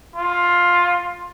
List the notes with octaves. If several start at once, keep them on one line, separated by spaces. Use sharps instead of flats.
F4